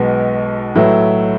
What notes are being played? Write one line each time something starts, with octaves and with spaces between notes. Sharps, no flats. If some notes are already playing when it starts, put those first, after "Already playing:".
Already playing: B1 B2 G#3 B3
A2 F#3 A3 E4 B4